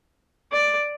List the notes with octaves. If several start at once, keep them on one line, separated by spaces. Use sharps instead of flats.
D5